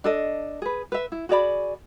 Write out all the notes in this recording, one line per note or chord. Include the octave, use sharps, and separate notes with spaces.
D4 A4 D#5
G#4 B4
B4 E5
E4
F#4 G#4 D5 B5